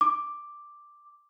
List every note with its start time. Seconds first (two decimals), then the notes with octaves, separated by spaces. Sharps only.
0.01 D6